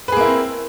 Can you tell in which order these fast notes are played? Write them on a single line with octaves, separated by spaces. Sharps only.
B4 G#4 A#3 E4 C4